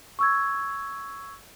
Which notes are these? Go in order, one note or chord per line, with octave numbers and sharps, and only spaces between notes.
C#6 E6 G#6